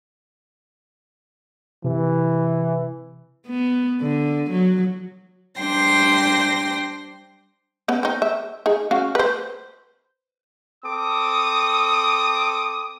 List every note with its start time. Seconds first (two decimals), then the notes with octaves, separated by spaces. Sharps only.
1.84 C3 E3
3.47 B3
4.01 D3
4.51 F#3
5.60 G3 D4 C5 G5 C6 A#6
7.88 B3 C#4
8.03 C4 D#4
8.22 E5
8.66 D#4 G#4
8.91 C#4 F#4 F5
9.15 B4 C5
10.85 C4 A4 D6 D#6